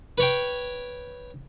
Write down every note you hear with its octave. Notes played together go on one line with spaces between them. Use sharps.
B4 C#5 G5